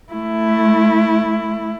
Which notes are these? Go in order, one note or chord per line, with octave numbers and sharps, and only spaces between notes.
A3 E4